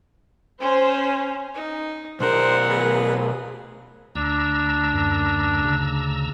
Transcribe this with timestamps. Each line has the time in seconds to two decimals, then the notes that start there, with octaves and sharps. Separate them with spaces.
0.61 C#4 C5
1.55 D#4
2.20 B1 A#4 C5 F#5
2.69 G#4 B4
4.15 D2 D4 A#5 E6
4.94 F#2
5.64 C#3